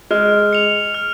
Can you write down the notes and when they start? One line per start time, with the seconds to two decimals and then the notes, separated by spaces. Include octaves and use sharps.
0.11 G#3 F6
0.53 C#7 F7
0.95 F6